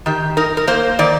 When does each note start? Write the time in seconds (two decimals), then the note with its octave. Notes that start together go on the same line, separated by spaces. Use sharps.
0.06 D#3 G4
0.37 D#4 A#4
0.57 A#4
0.67 A#3 C5
0.99 D#3 D5